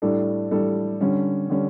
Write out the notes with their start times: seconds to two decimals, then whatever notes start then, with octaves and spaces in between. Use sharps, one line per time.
0.02 A2 G3 D4 A4
0.51 A2 G3 D4 A4
1.01 D3 G3 C#4
1.50 D3 G3 C#4